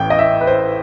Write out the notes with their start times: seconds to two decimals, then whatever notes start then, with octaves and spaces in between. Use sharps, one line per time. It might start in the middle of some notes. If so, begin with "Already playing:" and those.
Already playing: A1 A2 E3 G5
0.10 D#5
0.19 E5
0.41 B4
0.47 C5